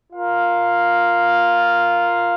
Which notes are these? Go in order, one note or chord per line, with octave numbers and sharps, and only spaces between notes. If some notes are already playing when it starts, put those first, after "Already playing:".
F4 A#4 F5